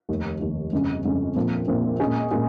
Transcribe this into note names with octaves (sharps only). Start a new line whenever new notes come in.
F1 D#2 D#3
F1 D#2 D#3
G1 F2 C#3 G#3 C#4
G1 F2 C#3 G#3 C#4
A#1 A#2 F3 C4
A#1 A#2 F3 C4
A#2 G#3 C#4 G#4
A#2 G#3 C#4 G#4